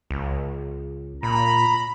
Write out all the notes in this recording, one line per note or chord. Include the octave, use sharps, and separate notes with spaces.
C#2
A#2 A#5 B5